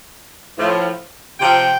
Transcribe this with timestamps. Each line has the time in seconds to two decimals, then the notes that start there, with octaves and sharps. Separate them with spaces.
0.58 A2 F3
1.40 C3 F3 G5